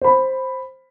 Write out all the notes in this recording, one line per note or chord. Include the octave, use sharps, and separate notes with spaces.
C5 B5